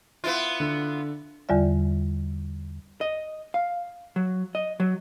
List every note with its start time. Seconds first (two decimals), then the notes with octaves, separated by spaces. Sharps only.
0.24 B3 E4 F4
0.60 D3
1.49 E2 D3 G3 F4 D5 E5
3.01 D#5
3.54 F5
4.16 F#3
4.55 D#5
4.80 F#3